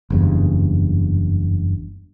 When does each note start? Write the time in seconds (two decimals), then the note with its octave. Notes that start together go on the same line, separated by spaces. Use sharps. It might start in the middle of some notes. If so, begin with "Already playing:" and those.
0.10 F#1 E2 G2